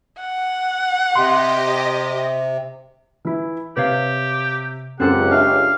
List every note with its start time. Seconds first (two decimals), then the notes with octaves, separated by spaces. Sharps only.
0.20 F#5
1.15 C3 G4 D#5 C6
3.25 E3 E4
3.77 C3 G4 B4 C#5 F5
5.00 C#2 F#2 C4 G4 A4 C5 F#5
5.31 D4 E5 F5